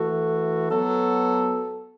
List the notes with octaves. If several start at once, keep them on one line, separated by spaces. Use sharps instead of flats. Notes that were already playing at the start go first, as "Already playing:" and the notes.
Already playing: E3 A3 F#4 A4
F#3 B3 A4